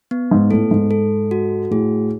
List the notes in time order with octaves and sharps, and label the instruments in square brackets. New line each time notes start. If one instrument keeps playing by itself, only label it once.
[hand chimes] B3
[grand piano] G#2
[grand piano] A2 [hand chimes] A4
[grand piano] G#2
[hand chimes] A4
F#4
[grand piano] A2 [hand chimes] G#4